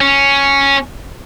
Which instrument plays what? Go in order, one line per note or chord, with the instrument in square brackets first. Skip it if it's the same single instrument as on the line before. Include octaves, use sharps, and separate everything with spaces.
[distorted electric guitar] C#4